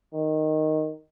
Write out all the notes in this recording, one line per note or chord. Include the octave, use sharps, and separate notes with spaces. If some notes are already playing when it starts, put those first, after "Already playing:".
D#3